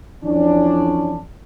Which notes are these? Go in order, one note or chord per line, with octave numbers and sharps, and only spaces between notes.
F2 E3 C#4 D4